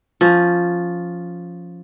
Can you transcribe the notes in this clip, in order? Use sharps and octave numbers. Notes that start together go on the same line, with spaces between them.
F3 C#4